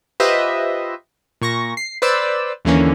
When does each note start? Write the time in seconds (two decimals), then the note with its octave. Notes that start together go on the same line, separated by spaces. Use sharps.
0.20 F4 G4 B4 C5 D#5 E5
1.42 A#2 C#6 A#6
1.77 C7
2.02 B4 C5 D5 E6
2.65 D#2 D3 E3 A#3 C#4